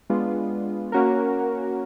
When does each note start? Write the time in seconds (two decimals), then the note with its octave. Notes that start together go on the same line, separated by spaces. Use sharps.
0.10 G#3 B3 D4 F4
0.92 A#3 C#4 F#4 A#4